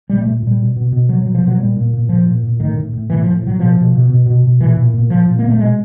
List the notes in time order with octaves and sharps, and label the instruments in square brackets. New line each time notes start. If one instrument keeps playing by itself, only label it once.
[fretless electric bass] A#2 G3
A3
A#2
A#2 G3
B2
B2
B2
B2 F#3
F#3
B2
F3
B2 F#3
A#2 G3
A#2
A#2
A#2 F3
A#2
A#2
A2 D#3
A2
A2
A2 E3
F3
A2
A2 F#3
B2 F3
B2
B2
B2
B2
B2
A#2 E3
A#2
A#2
A#2 F3
A#2
A#2 A#3
A3
B2 G#3